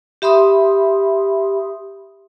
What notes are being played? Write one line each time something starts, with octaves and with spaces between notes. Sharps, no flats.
G4 E5 B5 C6 D#6